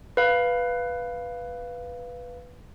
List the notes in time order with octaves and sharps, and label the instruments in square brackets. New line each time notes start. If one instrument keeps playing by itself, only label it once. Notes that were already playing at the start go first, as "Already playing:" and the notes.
[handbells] B4 F5